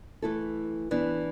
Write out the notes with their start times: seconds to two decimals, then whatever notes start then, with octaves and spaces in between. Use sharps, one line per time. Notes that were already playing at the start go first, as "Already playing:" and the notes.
0.22 E3 A3 E4 A4
0.91 E3 B3 D4